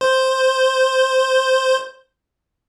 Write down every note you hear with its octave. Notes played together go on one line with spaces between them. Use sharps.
C5 G6